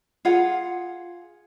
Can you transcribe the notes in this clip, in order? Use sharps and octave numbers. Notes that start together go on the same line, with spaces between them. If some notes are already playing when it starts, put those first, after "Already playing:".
F4 G#4 F#5